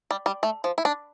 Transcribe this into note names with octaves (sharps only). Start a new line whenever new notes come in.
G3
G3
A3
F3
E4
D4